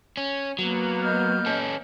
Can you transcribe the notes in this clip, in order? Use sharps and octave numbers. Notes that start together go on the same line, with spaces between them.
C#4
F#3 A#3 B3
D#5 F6 G6
C#4 A4